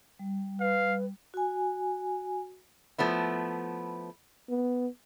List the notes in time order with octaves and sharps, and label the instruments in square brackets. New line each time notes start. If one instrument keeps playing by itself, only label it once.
[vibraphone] G3
[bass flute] B4 [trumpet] F5
[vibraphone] F#4 G#5
[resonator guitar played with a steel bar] F3 A3 B3 E4
[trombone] B3